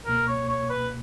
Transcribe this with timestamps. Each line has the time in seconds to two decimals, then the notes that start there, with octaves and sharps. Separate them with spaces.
0.06 C#2 B2 A#3 A#4
0.27 C#5
0.49 C#5
0.70 B4